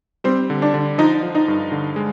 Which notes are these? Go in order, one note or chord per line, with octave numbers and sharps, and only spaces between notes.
G3 C4
D3
D4
D3
F3 D#4
F3
D#4
G2
D3
G#3